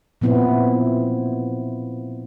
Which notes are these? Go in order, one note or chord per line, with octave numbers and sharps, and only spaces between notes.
A#2 F3 B3 C4 E4